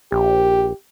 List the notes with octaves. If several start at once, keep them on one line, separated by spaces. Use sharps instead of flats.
A#1 G4